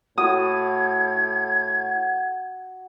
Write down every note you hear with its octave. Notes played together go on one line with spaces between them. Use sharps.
A2 F#4 D#6 G#6